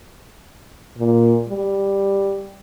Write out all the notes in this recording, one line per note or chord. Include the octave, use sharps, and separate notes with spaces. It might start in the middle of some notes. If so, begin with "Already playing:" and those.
A#2
G3